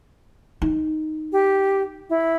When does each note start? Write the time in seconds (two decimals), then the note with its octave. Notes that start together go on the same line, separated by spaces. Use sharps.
0.62 D#4
1.32 G4
2.10 E4